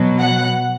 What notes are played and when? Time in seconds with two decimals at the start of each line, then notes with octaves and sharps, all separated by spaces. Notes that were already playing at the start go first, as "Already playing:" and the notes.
Already playing: B2 F#3
0.21 F#5